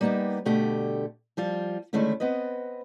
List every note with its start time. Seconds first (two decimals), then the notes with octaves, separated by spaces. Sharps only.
0.01 G3 A#3 B3 D#4 G4
0.45 G2 B2 D3 A3 G4
1.37 F3 G3 F4
1.93 D3 D#3 G#3 A3 C#4 E4
2.20 B3 C4 B4 D#5